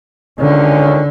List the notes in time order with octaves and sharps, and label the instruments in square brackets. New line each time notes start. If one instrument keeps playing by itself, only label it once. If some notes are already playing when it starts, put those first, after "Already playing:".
[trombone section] C#2 D#3 C#4 [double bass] D3